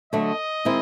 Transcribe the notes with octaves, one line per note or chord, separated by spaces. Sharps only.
D3 F#3 A3 D4 F#4 D#5
D#3 G#3 C4 E4